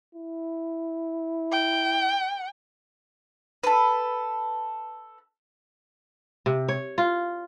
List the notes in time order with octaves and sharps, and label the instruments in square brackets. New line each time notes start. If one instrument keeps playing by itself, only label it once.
[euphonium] E4
[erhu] G5
[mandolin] A4 B4
[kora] C3
C#5
F4